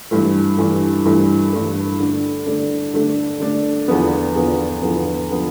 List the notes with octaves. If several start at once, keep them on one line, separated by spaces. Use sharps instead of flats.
G2 E3 A3
G2 E3 A3
G2 E3 A3
G2 E3 A3
D3 A3 D4
D3 A3 D4
D3 A3 D4
D3 A3 D4
E2 D3 F3 B3
E2 D3 F3 B3
E2 D3 F3 B3
D3 F3 B3